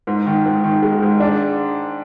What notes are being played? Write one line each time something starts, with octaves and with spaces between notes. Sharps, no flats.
G#2
D#3
G#2
D#3
G#3
G#2
D4